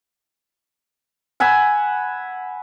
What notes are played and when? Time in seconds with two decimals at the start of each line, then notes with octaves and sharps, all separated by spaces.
1.40 F#5 G#5 B5 E6